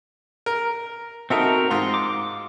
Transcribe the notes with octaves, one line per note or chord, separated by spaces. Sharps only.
A#4
C4 D#4 F#4 A4 A#4 E5
G#2 F4 C6
D6